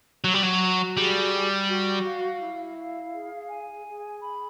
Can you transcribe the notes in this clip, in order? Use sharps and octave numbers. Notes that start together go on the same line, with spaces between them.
F#3 F#4
G3
F#3
F#4
G3 G#4
G5
F#4
F5
E4
F5
G#4
G#5
G#4
B5